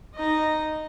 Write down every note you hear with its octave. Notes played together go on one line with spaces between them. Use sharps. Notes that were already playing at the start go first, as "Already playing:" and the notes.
D#4 D#5